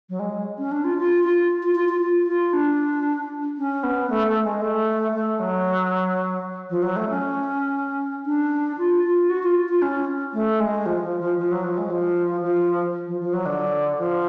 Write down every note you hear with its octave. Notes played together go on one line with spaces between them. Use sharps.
F#3
G#3
C#4
D4
F4
F4
F4
F4
F4
F4
F4
F4
D4
C#4
B3
A3
A3
G#3
A3
A3
F#3
F3
F#3
A3
C#4
D4
F4
F4
F#4
F4
F4
C#4
A3
G#3
F3
F3
F3
F3
F#3
F3
G#3
F3
F3
F3
F3
F#3
D3
F3